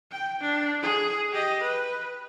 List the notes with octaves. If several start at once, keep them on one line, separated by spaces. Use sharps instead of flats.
G5
D4
G#4
G4 D#5
B4